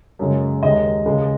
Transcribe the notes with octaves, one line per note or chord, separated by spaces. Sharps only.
F#2 C#3 G#3
D#2 D#3 G#3 D#5
C#2 C#3 G#3